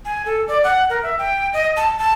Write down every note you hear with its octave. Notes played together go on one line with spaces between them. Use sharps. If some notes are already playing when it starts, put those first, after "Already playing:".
G#5
A4
D5
F#5
A#4
E5
G5
D#5
A5
A5